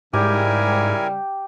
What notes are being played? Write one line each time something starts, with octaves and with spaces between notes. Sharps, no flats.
G#2 C#3 G3 E4 G4 A#4 G#5